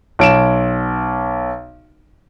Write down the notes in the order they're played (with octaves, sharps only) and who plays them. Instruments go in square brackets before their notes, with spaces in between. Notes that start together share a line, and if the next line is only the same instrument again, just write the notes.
[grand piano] B1 D7 E7